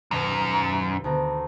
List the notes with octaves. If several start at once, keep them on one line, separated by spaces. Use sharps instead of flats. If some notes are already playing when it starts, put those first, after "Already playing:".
D#1 F#2 B2 A#6
D2 B3 A#5